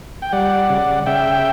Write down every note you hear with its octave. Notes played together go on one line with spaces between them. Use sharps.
G5
G3 D5 F#5
C#3
C#3 E5 G5